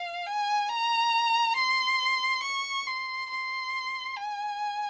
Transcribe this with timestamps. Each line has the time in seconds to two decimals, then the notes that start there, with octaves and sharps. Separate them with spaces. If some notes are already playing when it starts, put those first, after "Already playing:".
Already playing: F5
0.26 G#5
0.70 A#5
1.56 C6
2.43 C#6
2.87 C6
3.30 C6
4.16 G#5